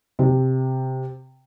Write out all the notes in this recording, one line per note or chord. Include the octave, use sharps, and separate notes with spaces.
C3